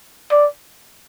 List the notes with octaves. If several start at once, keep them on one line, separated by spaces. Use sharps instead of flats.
D5